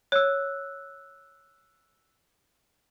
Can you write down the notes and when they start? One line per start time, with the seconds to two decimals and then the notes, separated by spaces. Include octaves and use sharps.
0.12 C#5 E6 F#6